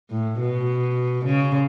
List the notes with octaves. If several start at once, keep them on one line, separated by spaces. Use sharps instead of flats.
A2
B2
C#3